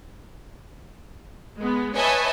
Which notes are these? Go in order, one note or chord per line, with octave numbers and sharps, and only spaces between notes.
G#3 B3
B4 C#5 D#5 E5 G#5 A5